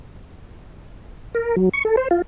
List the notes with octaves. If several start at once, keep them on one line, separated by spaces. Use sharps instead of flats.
A#4
F#3
C#6
A4
C5
F4